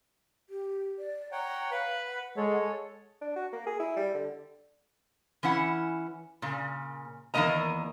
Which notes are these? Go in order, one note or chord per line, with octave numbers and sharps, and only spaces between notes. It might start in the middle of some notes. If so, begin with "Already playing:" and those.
G4
D5
C#5 F#5 G5 A#5
B4 F5 B5
F#5
G#3 A4 C#5
D4
F#4
A#3
G#4
E4
G3
D3
E3 C#4 E4 F#5
A#2 C#3
E2 D#3 F3 A#3 D#5 A#5